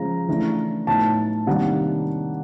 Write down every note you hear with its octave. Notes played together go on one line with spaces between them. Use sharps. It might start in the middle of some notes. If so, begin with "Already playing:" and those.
Already playing: C#3 F3 G#3 A#5
C#3 E3 A3 D4
A2 F#3 B3 D#4 A5
C3 D#3 G3 A#3 D4 F#5